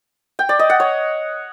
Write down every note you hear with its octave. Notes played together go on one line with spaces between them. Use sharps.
G5
D5
D#5
F#5
C#5